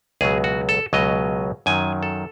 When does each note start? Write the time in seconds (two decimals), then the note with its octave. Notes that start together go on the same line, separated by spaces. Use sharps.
0.21 C#2 B2 F#3 G#4
0.44 F#4
0.69 A4
0.93 C#2 B2 F#3 D#5
1.66 F#2 D#3 F#3 G#5
2.03 A4